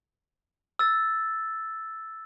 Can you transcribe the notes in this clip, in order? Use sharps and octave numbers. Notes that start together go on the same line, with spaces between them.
E6 A6